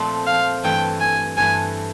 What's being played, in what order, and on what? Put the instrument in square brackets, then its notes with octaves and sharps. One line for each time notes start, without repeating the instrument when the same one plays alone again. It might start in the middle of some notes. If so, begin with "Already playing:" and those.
Already playing: [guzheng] A#2 F3 A3 C4
[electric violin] F5
[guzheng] G2 E3 A3 [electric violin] G5
[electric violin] G#5
[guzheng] G2 E3 A3 [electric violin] G#5